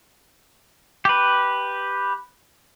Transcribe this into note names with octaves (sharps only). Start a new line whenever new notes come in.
G4 B4